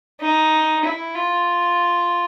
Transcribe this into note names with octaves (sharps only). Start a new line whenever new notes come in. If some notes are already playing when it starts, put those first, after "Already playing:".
D#4
E4
F4